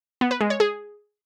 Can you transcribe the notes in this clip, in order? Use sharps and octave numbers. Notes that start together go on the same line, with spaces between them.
B3
B4
G#3
C#5
G#4